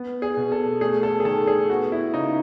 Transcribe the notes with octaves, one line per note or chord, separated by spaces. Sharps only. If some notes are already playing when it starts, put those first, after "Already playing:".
Already playing: B3
G#4
B2
A4
A3 G#4
A4
G#4
D#3 A4
G#4
B3 F#4
E4
C#3 D#4